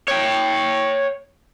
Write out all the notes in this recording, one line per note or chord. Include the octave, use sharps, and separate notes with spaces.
C#5 G5